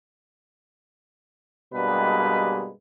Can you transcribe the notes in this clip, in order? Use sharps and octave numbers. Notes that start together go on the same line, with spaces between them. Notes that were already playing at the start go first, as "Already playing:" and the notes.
G2 B2 G3 G#3 A#3 B4